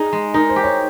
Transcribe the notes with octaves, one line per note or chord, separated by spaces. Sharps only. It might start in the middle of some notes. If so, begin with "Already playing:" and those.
Already playing: D#4 F4 G#4
G#3
D#4 A#4
C5
G4
C#5